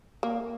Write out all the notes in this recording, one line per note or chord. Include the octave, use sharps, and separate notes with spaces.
A#3